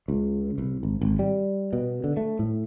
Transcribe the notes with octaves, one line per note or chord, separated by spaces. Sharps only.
C#2
C2
G#1
G#1
G3
B2
D3
A3
A2